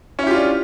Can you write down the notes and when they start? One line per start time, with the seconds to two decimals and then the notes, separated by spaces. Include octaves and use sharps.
0.19 C#4
0.23 E4
0.27 G4
0.31 F4
0.35 D4